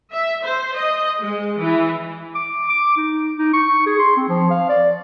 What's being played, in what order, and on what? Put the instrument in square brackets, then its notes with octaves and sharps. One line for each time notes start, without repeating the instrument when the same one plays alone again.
[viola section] E5
C5
D#5
G#3
E3
[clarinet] D6
D6
D#4
D#4
C#6
G#4
C6
C4
F3
F5
D5